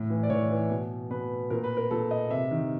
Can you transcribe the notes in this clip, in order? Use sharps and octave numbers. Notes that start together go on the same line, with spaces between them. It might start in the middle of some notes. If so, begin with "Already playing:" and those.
Already playing: A2
E3
D5
A2 C#5
E3
B2
B2 B4
A#2 A#4
B4
A#4
A#2 A4
D#5
C3 E5
D#3